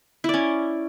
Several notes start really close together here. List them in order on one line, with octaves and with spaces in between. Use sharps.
E4 D5 C#4